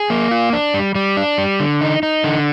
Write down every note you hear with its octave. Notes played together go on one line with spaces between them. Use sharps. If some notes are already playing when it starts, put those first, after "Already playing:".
Already playing: G#4
A#3
F4
D4
G3
G3
D4
G3
D3
D#4
D#4
D3